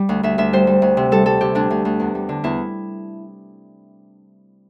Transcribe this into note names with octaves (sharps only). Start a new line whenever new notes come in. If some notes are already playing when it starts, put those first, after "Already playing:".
Already playing: G3 G5
D2
D2 E5
D2 E5
G3 C5
G3
D2
C3
G3 A4
G3 A4
C3 G4
D2 D4
D2
D2
E2
G3
D3
E2 E4